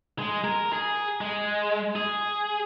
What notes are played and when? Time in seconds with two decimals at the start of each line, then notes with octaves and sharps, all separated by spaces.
0.19 G#3
0.44 A#4
0.73 G#4
1.21 G#3
1.96 G#4